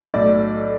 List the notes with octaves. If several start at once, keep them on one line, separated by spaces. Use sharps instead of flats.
B1 A2 F#3 D5